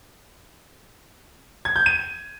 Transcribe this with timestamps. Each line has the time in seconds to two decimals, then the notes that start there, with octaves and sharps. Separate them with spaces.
1.65 G#6
1.76 G6
1.86 D#7